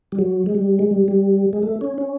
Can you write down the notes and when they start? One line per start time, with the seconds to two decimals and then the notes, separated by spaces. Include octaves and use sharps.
0.12 G3
0.19 F#3
0.46 G#3
0.55 G3
0.79 G#3
0.91 G3
1.08 G3
1.53 G#3
1.63 A3
1.81 C#4
1.98 C#4